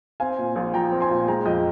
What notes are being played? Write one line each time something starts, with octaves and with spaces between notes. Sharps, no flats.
C4 F5 G#5
A#2
A#1
F3 G5 A#5
C4
G#5 C6
A#2
G#3 G5 A#5
F2 D#5 G5